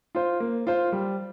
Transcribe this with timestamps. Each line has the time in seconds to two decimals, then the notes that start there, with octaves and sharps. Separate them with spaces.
0.15 F4 C5
0.40 A#3
0.67 F4 C5
0.92 G3